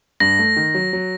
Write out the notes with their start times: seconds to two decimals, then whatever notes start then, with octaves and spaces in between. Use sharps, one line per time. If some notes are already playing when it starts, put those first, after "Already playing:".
0.20 G2 A#6
0.39 A3
0.57 D#3
0.74 F#3
0.93 F#3